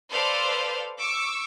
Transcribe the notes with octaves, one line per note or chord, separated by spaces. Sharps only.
A4 B4 C5 D5 F5
C#6 D6 E6 C#7